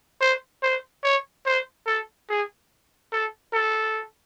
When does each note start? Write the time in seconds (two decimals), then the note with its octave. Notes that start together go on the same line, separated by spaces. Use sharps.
0.21 C5
0.63 C5
1.03 C#5
1.46 C5
1.86 A4
2.29 G#4
3.12 A4
3.53 A4